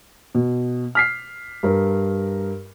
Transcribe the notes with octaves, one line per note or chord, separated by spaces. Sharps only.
B2
F6 B6 C7
G2 A#4